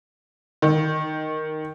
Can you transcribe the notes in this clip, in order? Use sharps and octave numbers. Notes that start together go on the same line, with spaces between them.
D#3